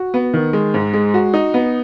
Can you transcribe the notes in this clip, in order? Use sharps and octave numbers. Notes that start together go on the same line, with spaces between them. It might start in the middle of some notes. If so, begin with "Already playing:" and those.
Already playing: F#4
B3
D#3
G#3
G#2
G#3
F#4
D#4
B3